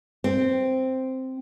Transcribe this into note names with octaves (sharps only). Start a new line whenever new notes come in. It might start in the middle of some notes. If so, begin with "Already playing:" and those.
C4